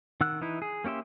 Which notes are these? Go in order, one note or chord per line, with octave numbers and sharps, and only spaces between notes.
D#3 F#5 E6 F#6
E3 D#4 E4
G#4
A#3 C#4 G4 E5 C6